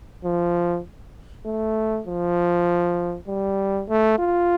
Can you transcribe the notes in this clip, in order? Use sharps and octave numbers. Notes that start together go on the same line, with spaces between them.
F3
A3
F3
G3
A3
F4